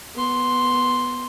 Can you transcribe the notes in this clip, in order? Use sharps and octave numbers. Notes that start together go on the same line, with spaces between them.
B3 C6